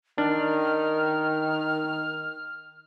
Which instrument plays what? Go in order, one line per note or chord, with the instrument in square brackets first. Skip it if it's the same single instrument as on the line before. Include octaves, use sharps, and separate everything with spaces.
[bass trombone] D#3 [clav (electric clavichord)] D4 [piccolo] F6